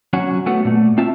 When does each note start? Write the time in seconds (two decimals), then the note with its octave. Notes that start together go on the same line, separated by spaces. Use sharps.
0.13 F#3 C#4 F#4
0.46 A3 B3 F#4
0.65 A#2 A3
0.98 C4 F4 E5 A5